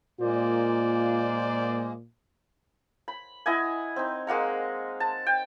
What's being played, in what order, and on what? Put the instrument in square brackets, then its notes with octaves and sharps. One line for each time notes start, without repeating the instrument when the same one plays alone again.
[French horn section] A#2 [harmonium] G#3 A#3 [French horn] F4 [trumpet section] C5 D5
[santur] B5
E4 D#5 F#5 G#5
C4 D#4
G#3 A#3 F#5 A#5
A5
G5